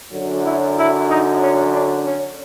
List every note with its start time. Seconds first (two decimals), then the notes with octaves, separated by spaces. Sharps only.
0.10 F#2 D3 F#3
0.44 E4
0.76 E4
1.09 D#4
1.41 C#4
1.74 D4
2.05 C#4